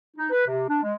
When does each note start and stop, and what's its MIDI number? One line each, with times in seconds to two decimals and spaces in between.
0.17 0.29 63
0.30 0.43 71
0.47 0.67 48
0.68 0.79 62
0.82 0.94 56